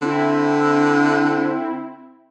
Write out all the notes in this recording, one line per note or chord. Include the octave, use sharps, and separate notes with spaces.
D3 C4 E4